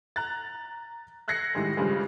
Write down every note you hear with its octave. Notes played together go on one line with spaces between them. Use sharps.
A#5 F#6 A6
E6 F#6 G#6 A#6 C7 C#7
A2 D#3 G3 G#3
G2 C#3 F3 G3 G#3